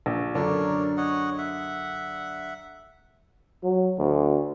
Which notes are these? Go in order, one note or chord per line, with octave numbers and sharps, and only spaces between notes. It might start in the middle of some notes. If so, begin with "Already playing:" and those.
A#1
F#2 D3 D4 A#4 C#5 D5
C#5 D#5 F#5
E5 F#5
F#3
D2